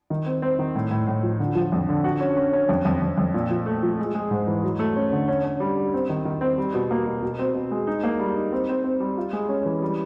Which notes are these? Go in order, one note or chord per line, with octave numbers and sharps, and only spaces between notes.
D#3
C4
C4
D#3
A2
A2
A2
F3
D3
F3
F2
D3
F#4
C#4
C#4
C#4
F2
F2
F2
F2
A#2
F3
A3
F3
G#3
G#3
G#2
E3
F#3
A3
C#4
D3
C#4
C#4
G3
G3
C4
D#3
D#3
C4
G3
B2
A#3
B2
B2
C4
B2
G#3
D#4
A#3
G3
D#4
C4
C4
C4
G3
F4
G#3
C#4
E3
G3